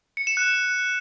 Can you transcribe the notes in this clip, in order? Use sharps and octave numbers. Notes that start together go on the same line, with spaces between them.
C#7
E7
F#6